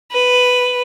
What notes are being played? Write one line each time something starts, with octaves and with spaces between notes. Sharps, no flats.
B4